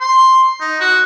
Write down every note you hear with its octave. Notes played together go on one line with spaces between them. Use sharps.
C6
D#4
F#4